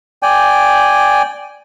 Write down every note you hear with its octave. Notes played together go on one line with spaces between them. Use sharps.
D5 G5 G#5